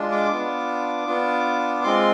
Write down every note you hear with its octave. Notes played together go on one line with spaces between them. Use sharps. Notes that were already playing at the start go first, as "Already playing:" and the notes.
Already playing: G#3 D4 F4
D6
B3 D4 F4
B3 D4 F4
G#3 C4 F4 C6